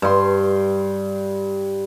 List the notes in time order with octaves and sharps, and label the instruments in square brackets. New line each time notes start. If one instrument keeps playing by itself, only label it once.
[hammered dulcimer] G2 C6